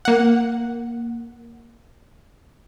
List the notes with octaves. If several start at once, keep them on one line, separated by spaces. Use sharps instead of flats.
A#3 F#5